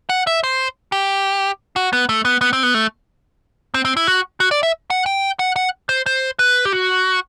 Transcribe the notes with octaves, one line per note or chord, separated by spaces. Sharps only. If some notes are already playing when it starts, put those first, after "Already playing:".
F#5
E5
C5
G4
F#4
B3
A3
B3
B3
C4
B3
A3
C4
C4
E4
F#4
F#4
D5
E5
F#5
G5
F#5
F#5
C5
C5
B4
G4
F#4